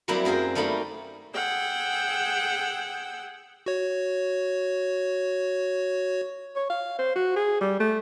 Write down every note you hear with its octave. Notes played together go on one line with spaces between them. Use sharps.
F#3 G3 A#3 C4 E4 G4
F#2 A#3 G#4 C5 G5
G3 A3 A#3 D#4 B5
G#4 F#5 G5 E6
F#4 C#5
C#5
F5
C5
F#4
G#4
G3
A3